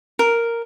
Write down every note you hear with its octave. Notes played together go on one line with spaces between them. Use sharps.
A#4